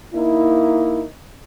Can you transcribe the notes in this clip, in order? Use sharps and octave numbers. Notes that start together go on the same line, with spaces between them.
A#3 D#4 E4